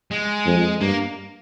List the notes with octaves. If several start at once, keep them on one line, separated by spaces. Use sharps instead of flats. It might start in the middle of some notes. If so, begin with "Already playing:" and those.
G#3
F2
G2 A#3